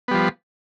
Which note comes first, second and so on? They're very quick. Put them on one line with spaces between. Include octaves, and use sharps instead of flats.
B3 G3 F3